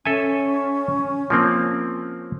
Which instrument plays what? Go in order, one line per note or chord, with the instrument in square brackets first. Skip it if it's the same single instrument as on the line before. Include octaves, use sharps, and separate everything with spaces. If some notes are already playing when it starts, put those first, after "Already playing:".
[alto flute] C#4 [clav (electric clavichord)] A4 E5 G#5
[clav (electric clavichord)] F3 A#3 C4